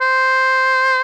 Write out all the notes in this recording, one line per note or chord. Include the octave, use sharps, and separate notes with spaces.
C5